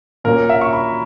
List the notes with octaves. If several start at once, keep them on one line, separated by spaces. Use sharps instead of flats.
A#2 A#3 C#4 A#4
E5
C#6
B5